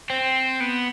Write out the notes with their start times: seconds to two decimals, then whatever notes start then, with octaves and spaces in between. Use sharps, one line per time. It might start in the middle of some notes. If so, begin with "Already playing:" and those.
0.10 C4
0.60 B3